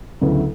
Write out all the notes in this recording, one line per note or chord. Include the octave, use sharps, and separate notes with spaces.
D2 C#3 F#3 B3 E4